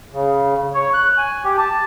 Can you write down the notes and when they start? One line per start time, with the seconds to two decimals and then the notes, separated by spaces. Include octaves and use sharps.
0.13 C#3
0.74 C#5
0.94 F#6
1.18 G#5
1.44 G4
1.58 A5